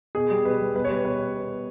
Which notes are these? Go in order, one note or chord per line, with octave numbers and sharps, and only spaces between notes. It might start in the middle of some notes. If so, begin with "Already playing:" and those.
B2 G#4
G3
B2 B4
G3
B2 B4
C#5
G3 B4
B2 B4